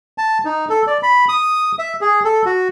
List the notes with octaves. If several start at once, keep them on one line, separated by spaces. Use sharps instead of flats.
A5
D#4
A4
D5
B5
D#6
E5
G#4
A4
F#4